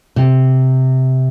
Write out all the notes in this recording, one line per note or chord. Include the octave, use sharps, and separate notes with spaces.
C3